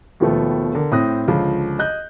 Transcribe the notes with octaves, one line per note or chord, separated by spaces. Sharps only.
D#2 B2 D#3 F3 A3 B3
D3 A#4
A2 C4 D#6 F#6 A#6
C#2 D3 F3
D#5 F#6 G6